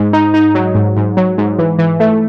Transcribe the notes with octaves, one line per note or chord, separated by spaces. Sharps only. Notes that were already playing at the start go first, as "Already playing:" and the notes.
Already playing: G#2
D#4
D#4
F#3
G#2
G#2
F#3
G#2
E3
E3
A3